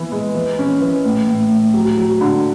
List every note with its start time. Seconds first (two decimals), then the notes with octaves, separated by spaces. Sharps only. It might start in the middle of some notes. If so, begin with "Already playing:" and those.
Already playing: E3 B3
0.12 G#3
0.35 E3
0.59 C#4
0.82 E3
1.05 A2
1.28 A2
1.51 A2
1.74 F#3
1.98 F#3
2.21 D3